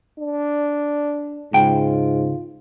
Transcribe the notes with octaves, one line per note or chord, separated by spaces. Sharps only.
D4
C#2 G#2 F4 G5